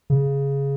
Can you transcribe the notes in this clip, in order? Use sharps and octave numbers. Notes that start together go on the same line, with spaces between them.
C#3